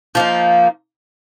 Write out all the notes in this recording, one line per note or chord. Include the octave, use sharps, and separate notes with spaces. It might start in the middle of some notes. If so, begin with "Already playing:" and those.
F3 A#3 D#4